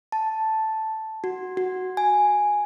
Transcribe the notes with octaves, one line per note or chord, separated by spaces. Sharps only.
A5
F#4
F#4
G#5